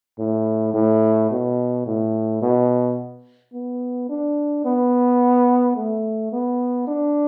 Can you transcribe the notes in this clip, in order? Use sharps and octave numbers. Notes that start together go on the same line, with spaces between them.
A2
A2
B2
A2
B2
B3
D4
B3
A3
B3
D4